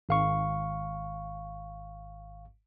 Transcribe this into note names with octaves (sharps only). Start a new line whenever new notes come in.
G#1 F5 C#6